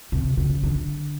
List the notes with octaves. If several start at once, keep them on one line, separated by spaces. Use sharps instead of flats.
C3
C#3
D3